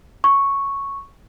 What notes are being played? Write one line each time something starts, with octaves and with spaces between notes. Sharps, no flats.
C#6